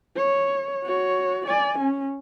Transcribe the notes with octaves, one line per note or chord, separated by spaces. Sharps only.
C#5
F#4 C#5
D5 G#5
C#4